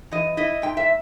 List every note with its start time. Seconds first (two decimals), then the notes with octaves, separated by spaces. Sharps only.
0.12 E3 D#5
0.37 E4 D#5
0.62 G#2 G5
0.77 E5